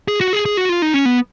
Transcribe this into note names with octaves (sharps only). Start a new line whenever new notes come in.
G#4
F#4
G#4
G#4
F#4
F4
D#4
C#4
B3